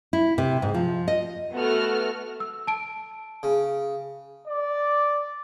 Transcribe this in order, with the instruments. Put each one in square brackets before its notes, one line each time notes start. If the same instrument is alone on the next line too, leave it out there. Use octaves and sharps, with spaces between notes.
[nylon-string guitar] E4
C3
G#2
F3
D#5
[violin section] A3 B3 F#4 A4 F#5 F6
[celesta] E6
A5 D7
[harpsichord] C#3
[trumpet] D5